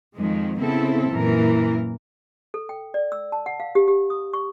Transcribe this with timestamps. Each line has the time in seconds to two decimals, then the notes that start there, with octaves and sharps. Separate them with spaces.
0.16 F2 D#3 F3 G#3
0.58 C#3 B3 C4 E4 A4
1.10 F#2 A#2 E3 A#4
2.54 A4
2.69 G5
2.94 D5
3.12 E6
3.32 A5
3.46 F#5
3.60 F5
3.75 G4
3.88 G4
4.10 D#6
4.33 C#6